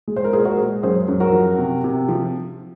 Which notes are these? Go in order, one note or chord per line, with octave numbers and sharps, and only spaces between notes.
G#3
C5
A#4
A#2 G#4 C5
F#4 A#4
G#3
F#2 G#4 C5
F#2
F#4 A#4
F3
C3
C3
F3